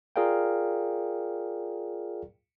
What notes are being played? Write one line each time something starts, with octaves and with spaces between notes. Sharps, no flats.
F4 G#4 A#4 D5 F5 G5